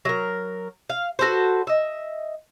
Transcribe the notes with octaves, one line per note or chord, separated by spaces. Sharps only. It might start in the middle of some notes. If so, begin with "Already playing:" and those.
F#3 A#4
F5
F#4 A4 B4 C5
D#5 E5